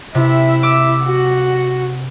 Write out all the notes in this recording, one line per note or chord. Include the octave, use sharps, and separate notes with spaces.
C3 E4 E5
D6 E6
F#4 F#5